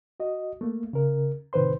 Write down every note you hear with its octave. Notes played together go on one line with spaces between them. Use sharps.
F#4 D#5
A3 A#3
C#3 A#4
A2 C3 D#3 B4 C5 C6